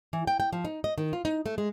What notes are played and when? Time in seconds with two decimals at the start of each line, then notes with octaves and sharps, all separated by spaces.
0.13 E3
0.27 G5
0.40 G5
0.53 F3
0.65 D#4
0.84 D#5
0.98 D#3
1.13 F4
1.25 D#4
1.46 A3
1.58 G#3